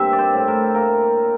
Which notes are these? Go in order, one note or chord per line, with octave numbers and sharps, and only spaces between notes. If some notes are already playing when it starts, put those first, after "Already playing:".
Already playing: G2 A#3 C4 A#4 E5
D5
C5
A2
A#4
A#3 A#4